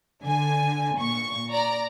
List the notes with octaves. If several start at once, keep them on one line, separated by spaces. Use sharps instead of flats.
D3 G#5
A#2 C#6
D5 A#5